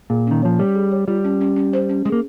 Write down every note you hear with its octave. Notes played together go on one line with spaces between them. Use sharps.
A#2 G#4
D#3 C#4
F3 C#5
G3 C#5
G#4
C#5
G3 F4
C#4
C#4
C#4
C5
C#4
G#3 G#4
A#3